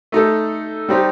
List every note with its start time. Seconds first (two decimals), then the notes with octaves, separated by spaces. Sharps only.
0.12 A3 D#4 A4
0.89 G3 C4 D#4 G4